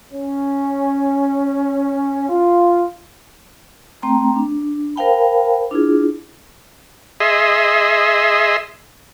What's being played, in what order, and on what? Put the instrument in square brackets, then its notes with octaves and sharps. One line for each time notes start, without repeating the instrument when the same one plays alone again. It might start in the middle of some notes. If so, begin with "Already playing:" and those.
[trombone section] C#4
F4
[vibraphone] A3 C4 G5 A#5
D4
A#4 C5 F5 G5 A5 B5
D4 E4 F4 G#4
[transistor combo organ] G#4 D#5 E5 C6